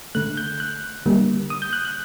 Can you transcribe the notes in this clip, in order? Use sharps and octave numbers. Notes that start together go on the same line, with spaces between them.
D3 A3 F#6
G6
F#6
D3 G3 A#3
D#6
G6
F#6
F#6